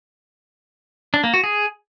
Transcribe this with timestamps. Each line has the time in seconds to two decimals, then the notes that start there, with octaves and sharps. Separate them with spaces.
1.14 D4
1.24 A#3
1.34 F#4
1.44 G#4